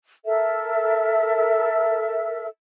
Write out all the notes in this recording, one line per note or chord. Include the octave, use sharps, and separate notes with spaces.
A4 A#4 E5